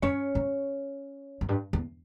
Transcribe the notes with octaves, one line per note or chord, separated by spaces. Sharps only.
F#2 C#4 C#5
F#2
F#2
G2
E2